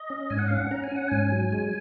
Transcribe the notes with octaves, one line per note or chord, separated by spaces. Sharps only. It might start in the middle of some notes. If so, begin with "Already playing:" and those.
Already playing: D#5
C#4
G#2 G#5
F#5
C#4 F5
F#5
C#4 A#5
G#5
C#4 F#5
G#2 G#5
F#3
G#3